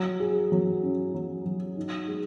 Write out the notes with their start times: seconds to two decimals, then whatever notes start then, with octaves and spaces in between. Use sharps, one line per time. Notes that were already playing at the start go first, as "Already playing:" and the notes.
Already playing: F#3
0.20 G#4
0.52 F#3
0.83 C#4
1.14 F#3
1.45 F#3
1.76 D#4
2.08 G#3